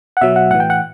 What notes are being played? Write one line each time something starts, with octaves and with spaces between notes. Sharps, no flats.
F#5
B2 F#3 E5
F#5
A2 E3 F#5
G5
F#5